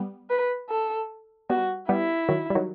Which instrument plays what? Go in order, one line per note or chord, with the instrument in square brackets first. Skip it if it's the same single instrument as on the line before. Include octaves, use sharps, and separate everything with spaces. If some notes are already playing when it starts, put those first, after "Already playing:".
Already playing: [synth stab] G3 B3
[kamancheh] B4
A4
[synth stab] G3 B3 [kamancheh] F#4
[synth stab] G3 B3 [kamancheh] E4
[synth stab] D#3 F#3
G3
D#3 F#3